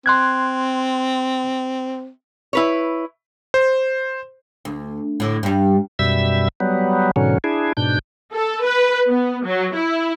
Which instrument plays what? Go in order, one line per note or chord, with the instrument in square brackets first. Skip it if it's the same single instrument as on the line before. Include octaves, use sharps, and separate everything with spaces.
[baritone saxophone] C4 [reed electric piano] C6 F#6 G#6
[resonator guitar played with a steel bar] E4 B4 C#5
[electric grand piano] C5
[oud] D2
A2 D3
G2 G3
[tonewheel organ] F#2 B2 G3 E5 E6
F#3 G3 B3
G#2 B2 D3 F#3 C#4
D4 E4 G#4
G#2 B2 D4 G6
[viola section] A4
B4
B3
F#3
E4